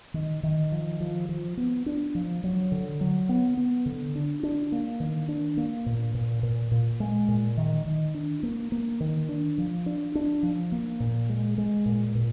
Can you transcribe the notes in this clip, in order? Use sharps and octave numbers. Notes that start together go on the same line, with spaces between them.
D#3
D#3
F3
F3
F3
B3
D4
F3
F#3
D3
F#3
B3
B3
D3
D4
D4
A#3
D#3
D4
A#3
A#2
A#2
A#2
A#2
G#3
A#2
D#3
D#3
D4
A#3
A#3
D#3
D4
F3
D4
D4
F3
A#3
A#2
G#3
G#3
A#2
A#2